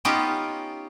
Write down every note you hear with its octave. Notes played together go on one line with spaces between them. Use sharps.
B3 C#4 D#4 F4 G4